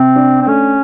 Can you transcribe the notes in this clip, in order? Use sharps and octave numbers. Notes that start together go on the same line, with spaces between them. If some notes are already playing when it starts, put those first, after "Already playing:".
Already playing: C3 C4
D4
C4
A3 C#4